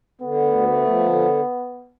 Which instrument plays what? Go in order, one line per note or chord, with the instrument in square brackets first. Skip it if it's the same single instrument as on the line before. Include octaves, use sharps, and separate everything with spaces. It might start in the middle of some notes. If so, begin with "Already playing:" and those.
[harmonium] D3 [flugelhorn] B3
[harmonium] D2
A3
F3
D3